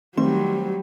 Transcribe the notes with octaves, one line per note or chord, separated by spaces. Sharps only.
D#3 F#3 G3 A3 C4 C6